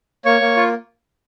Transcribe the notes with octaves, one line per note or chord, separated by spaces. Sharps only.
A#3 C#5 C#6
A#3
F4